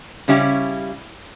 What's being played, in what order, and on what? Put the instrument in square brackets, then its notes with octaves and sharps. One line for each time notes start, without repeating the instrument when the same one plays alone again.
[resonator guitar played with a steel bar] C#3 G3 C#4 E4 G4